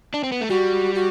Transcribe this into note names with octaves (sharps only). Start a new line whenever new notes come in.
D4
C4
B3
A3
G3 F#4
F#4